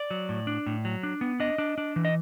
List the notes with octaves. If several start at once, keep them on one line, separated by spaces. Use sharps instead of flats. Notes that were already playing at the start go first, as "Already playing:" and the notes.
Already playing: D5
F#3
A2
D4
A2
F#3
D4
B3
D4 D#5
D4
D4
E3
D#5